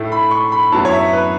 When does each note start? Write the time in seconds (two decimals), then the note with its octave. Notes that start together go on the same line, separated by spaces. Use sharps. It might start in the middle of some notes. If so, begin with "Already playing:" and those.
Already playing: A2 A3 E4
0.12 B5
0.31 C#6
0.52 B5
0.72 F#2 F#3 B3 E4 A5
0.85 C#5
0.93 E5
1.13 B4